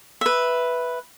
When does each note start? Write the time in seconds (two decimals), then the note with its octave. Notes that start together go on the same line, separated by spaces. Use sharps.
0.21 B4 E5